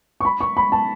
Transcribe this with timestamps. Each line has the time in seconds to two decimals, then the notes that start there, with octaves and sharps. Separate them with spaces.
0.21 C#6
0.25 B5
0.41 C#6
0.57 B5
0.72 A5